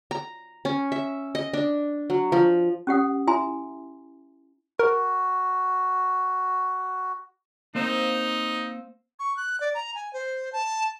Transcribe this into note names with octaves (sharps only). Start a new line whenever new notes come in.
A#5
C#4
E5
D#5
D4
F#3
F3
C#4 G4 F#5 D#6
E4 E5 G#5 A#5 C6
F#4 A#4
A#3 C4 D#4 C5
C#6
F#6
D5
A#5
G#5
C5
A5